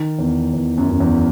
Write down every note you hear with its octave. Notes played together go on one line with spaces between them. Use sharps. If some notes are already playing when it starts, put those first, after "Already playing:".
Already playing: D#3
E2
E2
F#2
F#2
E2